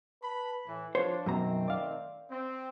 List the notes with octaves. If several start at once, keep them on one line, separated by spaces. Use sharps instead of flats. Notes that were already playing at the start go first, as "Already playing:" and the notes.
B4 A5 B5
A2 E3
F3 D4 C5 C#5
F#2 B2 D#3 A3 C4 A#5
D5 F5
C4